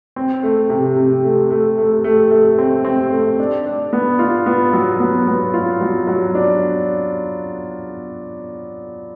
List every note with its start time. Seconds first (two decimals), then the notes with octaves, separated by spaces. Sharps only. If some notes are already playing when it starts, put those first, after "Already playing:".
0.16 C4
0.43 A3
0.70 C3
0.96 C3
1.24 A3
1.51 A3
1.78 A3
2.04 A3
2.31 A3
2.58 C4
2.85 C4
3.11 A3
3.39 D4
3.66 D4
3.93 B3
4.19 F4
4.46 B3
4.73 F#3
5.00 B3
5.27 B3
5.54 F4
5.81 F#3
6.07 F#3
6.35 D4